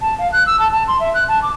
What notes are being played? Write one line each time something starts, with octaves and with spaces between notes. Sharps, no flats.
A5
F5
F#6
E6
A5
A5
C6
E5
F#6
A5
D6